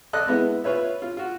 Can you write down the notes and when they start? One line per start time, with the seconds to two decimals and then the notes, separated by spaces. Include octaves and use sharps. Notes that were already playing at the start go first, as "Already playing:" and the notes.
0.13 A4 D5 D#5 F#6
0.27 G#3 B3 E4
0.64 F4 B4 C#5 E5
1.02 F4
1.17 F4 F#4